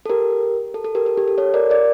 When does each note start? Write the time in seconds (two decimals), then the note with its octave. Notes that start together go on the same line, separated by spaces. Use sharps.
0.06 A4
0.10 G4 A#4
0.74 A4
0.84 A4
0.95 G4 A#4
1.06 A4
1.18 G4
1.28 A4
1.38 A4 C#5
1.54 A#4 D5
1.70 A#4 D5